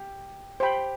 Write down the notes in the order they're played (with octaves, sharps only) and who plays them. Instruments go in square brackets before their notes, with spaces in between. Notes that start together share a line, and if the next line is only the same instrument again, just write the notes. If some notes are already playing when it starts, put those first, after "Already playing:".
Already playing: [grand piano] G4
[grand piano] G4 [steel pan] C5 G5 B5